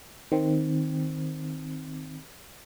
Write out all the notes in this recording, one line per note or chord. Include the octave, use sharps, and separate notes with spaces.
D#3 C4